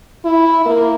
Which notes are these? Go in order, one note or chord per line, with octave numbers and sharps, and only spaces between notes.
E4
A#3